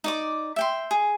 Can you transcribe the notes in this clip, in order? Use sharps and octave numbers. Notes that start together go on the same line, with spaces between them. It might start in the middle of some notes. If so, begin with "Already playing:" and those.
D#4 D5 D6
E5 G5 C6
G#4